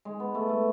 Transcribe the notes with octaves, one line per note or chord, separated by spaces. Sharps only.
G#3
B3
A3
A3